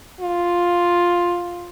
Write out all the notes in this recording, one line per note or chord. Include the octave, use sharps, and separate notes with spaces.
F4